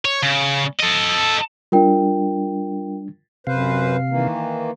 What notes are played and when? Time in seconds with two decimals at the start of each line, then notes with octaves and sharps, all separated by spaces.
0.05 C#5
0.23 C#3
0.80 A4 D#5
1.72 G3 D4 F4 A#4 G5
3.47 F#2 C3 B4 C5 F5
4.09 D#3 E3 A#3